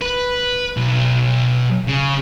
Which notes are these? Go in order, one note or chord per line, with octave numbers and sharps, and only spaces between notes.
B4
B1
C#3